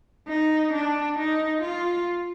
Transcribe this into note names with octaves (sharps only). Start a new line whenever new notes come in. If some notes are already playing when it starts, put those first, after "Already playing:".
D#4
D4
D#4
F4